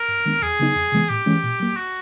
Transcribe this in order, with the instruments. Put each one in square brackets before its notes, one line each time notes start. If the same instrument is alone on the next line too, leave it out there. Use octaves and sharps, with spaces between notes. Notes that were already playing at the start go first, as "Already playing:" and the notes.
Already playing: [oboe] A#4
[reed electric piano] G2
D#3 G#3 B3 D4
[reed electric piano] E2 [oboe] G#4
[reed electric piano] C#3 F#3 B3 D#4
F2
C3 E3 G#3 B3
[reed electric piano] A2 [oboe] G4
[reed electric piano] E3 G#3 C#4
A#2
F#3 A#3
[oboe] F#4